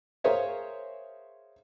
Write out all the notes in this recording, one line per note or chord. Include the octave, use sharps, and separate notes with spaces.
G#4 A#4 C5 C#5 E5 F5